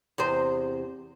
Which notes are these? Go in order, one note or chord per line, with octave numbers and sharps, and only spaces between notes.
E2 C3 C5